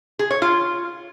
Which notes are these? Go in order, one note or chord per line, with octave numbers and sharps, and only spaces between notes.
G#4
C#5
F4